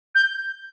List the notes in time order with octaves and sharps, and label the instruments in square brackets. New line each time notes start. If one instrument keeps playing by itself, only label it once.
[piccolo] G6